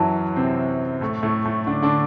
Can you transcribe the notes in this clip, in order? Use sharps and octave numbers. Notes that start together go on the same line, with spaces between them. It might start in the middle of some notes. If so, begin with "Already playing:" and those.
Already playing: F#2 E3 F#3 A5
C3 C4
A2 A3
A2 A3
A2 A3
D3 D4
D3 D4